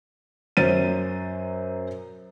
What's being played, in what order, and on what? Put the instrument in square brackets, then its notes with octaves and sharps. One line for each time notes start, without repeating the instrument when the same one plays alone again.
[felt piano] F#2 F#3 C5 A6 D#7